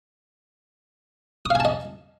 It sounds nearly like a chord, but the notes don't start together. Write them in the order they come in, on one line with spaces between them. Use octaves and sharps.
D#6 F5 G#5 A5 D#5